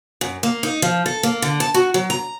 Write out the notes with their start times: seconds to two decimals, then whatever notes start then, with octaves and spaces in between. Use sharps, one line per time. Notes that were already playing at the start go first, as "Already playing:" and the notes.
0.21 F#2
0.43 A#3
0.63 D#4
0.82 F3
1.06 A4
1.23 A#3
1.42 D3
1.60 A5
1.74 F#4
1.94 F#3
2.10 A#5